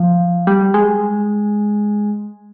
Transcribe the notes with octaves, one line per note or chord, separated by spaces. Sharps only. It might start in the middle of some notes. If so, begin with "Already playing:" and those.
Already playing: F3
G3
G#3